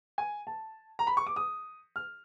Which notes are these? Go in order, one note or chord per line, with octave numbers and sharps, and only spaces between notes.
G#5
A5
A#5
B5
C#6
D6
D#6
F6